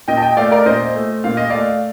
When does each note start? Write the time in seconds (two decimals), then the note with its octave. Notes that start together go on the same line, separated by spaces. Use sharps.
0.08 A#2 D#5 G5
0.17 A5
0.22 D#5 G5
0.37 A3 D5 F5
0.52 A#4 D5
0.66 A#2 C5 D#5
0.95 A3
1.24 A#2 F5
1.37 D#5
1.50 A3 D5 F5